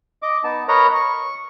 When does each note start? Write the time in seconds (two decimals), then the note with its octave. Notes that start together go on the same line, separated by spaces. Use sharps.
0.22 D#5 D6
0.44 B3 D#4 A5
0.68 A#4 B4 C#5 D#5 A#5
0.95 C#6